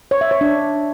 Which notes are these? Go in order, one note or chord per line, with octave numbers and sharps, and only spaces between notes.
C#5
E5
C#5
D4